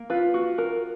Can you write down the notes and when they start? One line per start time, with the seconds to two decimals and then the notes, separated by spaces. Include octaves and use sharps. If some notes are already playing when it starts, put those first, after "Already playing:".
Already playing: A#3
0.10 F4 B4
0.34 F#4
0.58 A#4